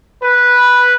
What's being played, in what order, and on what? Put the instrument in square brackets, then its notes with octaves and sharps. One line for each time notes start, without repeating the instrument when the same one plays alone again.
[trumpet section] B4